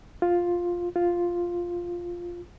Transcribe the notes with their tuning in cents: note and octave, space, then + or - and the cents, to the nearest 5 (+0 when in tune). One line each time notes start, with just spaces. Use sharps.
F4 +5
F4 +0